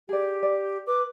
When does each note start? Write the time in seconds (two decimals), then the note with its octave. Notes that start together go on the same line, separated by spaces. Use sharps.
0.09 G4 G#4 D5
0.43 D5
0.87 B4 D6